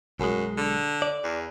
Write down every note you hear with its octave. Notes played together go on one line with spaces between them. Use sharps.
B1 F#2 G#3
D3
D5
E2